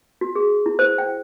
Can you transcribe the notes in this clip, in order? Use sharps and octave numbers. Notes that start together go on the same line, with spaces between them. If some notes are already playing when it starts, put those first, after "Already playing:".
F#4
G#4
E4
C5
G5